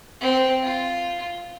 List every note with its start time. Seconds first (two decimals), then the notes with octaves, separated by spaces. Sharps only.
0.21 C4
0.62 F4